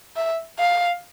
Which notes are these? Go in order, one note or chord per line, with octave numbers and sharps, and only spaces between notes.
E5
F5